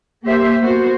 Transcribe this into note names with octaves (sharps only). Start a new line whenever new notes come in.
A#3 G4 C5 E5
A#3 B3 F#4 C5